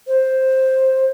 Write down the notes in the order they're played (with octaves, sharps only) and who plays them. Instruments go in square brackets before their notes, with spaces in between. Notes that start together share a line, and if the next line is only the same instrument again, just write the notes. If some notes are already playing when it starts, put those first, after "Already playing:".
[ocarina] C5